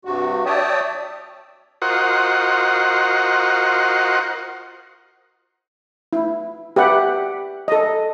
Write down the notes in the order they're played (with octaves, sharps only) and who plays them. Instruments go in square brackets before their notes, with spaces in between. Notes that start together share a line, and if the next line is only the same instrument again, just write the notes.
[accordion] G2 C3 F#4
C#5 D5 E5 G5 A5 D#6
[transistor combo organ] F4 F#4 A#4 C5 D#5 F#5
[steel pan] E4
G4 B4 E5 F#5
A4 D#5